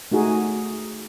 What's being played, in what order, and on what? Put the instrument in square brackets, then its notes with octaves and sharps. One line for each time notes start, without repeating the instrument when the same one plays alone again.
[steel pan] A3 D#4 F#4 G#4